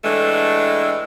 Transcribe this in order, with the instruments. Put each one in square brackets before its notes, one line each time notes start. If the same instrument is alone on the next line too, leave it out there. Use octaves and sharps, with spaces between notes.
[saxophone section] A2 E3 G#3 A3 D4